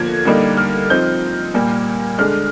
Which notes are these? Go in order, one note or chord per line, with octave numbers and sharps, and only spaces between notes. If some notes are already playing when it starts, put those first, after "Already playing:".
Already playing: D3 F3 A#3 G#6
D3 G3 A#3 D#4
F6
F3 C4 D#4 G6
A#2 G3 A#3
D3 G#3 D4 F6